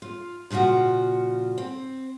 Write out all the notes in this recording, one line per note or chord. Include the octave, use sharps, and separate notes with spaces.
F4
A#2 C#3 F3 F4 F#4
C4